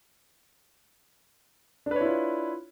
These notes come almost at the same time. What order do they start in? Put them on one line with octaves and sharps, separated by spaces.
D4 B4 C#5 E4 F4